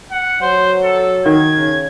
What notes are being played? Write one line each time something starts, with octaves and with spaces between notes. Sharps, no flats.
F#5
F#3 C5
A4
D#3 G#6
C#3